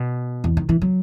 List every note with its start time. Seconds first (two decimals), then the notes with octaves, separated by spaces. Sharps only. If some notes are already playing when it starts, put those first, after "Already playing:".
Already playing: B2
0.44 E2
0.57 D#3
0.69 E3
0.82 F#3